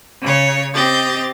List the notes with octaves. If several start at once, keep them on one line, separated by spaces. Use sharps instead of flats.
C#3 C#5
C4 G4 D#5 G6 A6